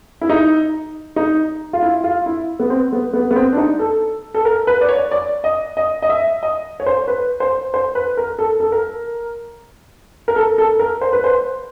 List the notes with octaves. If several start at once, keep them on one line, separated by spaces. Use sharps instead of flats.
E4
D#4
D#4
F4
E4
F4
E4
B3
C4
B3
B3
B3
C4
D4
D#4
A4
A4
A#4
B4
D5
C#5
D5
D#5
D#5
D#5
E5
D#5
C#5
C5
B4
C5
C5
B4
A#4
A4
A4
A#4
A#4
A4
A4
A#4
C5
B4
C5